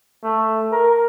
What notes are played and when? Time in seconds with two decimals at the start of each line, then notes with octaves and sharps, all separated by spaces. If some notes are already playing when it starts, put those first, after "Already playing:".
0.24 A3
0.72 A#4